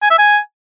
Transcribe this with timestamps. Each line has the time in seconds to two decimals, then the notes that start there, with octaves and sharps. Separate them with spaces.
0.02 G#5
0.10 E5
0.18 G#5